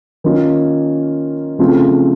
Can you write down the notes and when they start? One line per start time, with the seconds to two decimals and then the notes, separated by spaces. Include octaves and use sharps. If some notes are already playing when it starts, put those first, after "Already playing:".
0.24 D#3 A#3 C#4 F4
1.59 C#3 F3 A3 C4 F4